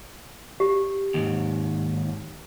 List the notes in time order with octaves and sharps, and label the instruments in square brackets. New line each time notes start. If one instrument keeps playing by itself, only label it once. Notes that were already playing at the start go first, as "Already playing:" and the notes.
[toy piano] G4
[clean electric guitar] D#2 G#2